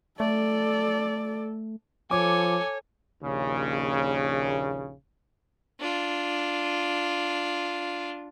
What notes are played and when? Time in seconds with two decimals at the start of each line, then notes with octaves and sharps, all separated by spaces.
0.20 A3 A4 D5
2.11 F3 A4 C#5 G#5 D6
3.22 A#1 D#2 C#3
5.80 D4 F4